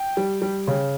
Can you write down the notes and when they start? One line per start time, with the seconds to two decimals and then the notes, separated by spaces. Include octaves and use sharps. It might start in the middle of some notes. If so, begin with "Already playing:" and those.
Already playing: G5
0.17 G3
0.42 G3
0.67 C#3